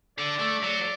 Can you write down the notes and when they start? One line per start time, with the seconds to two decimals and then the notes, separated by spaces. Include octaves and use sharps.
0.18 D3 D5
0.39 A3
0.62 F#3 D5